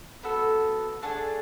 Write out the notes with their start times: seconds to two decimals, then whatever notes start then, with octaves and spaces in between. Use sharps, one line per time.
0.23 B3 F#4 A4
1.02 A3 D4 G#4 F#5 A5